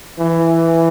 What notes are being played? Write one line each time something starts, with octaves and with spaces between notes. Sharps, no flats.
E3